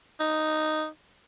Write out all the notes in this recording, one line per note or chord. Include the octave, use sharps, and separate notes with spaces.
D#4